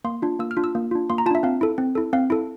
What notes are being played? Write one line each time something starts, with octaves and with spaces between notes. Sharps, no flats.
A#3 C6
D4 F4
A#3 E6
F6
D4 F4
E6
A#3
D4 F4
A#3 C6
A#5
D4 F4 E5 A5
C4 F5
E4 A4
C4
E4 A4
C4 F5
E4 A4